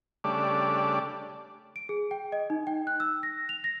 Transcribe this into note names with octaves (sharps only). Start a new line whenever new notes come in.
C#3 G3 A3 D4 D5
D7
G#4
G5
D#5
D#4
G5
F#6
E6
A#6
F7
A#6